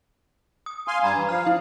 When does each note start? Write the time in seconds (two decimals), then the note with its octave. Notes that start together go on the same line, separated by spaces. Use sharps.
0.66 D#6
0.88 F5 G#5 C6
1.04 G2 G3 G#5 A#5 B5 G#6
1.16 E3
1.29 F3 F5 F6
1.47 E4